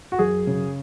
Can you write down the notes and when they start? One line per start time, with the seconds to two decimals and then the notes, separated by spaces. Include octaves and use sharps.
0.12 F#4
0.19 F#2 G#4
0.47 C#3